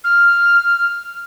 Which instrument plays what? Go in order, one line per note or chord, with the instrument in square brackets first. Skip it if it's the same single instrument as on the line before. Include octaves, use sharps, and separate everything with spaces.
[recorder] F6